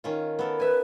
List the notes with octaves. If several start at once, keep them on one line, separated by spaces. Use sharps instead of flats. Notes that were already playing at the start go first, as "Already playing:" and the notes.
D#3 C#4 F4
B3 A4 A#4
B4 E5 G#5